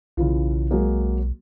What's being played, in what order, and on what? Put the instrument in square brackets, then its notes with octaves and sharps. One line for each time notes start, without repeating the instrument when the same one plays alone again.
[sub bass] B1 [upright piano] C#3 E3 F4
[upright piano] F#3 G#3 A#3